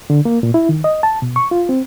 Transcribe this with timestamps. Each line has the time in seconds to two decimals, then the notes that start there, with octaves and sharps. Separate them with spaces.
0.10 D3
0.25 A#3
0.43 A#2
0.54 E4
0.69 D#3
0.84 D#5
1.03 A5
1.22 B2
1.36 C#6
1.51 F4
1.69 C4